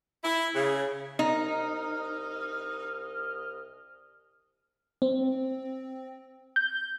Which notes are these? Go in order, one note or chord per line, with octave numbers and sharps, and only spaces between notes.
E4
C#3
C2 D#4 D#5 F6
C4
G6